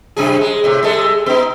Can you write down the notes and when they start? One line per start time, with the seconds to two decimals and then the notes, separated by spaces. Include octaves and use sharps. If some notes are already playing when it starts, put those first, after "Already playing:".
0.17 F#2 C3 G#4
0.41 G#3
0.64 A2 C3
0.83 G3 G#3 A4
1.26 B3 D#4